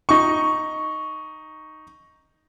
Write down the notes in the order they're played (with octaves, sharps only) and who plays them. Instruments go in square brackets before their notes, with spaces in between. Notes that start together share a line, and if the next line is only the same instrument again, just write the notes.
[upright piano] D#4 C#6